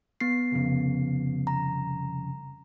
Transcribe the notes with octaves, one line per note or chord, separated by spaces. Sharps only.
B3 C7
C2 F2 C#3
A#5